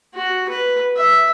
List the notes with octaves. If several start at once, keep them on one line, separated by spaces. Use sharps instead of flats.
F#4
B4
E5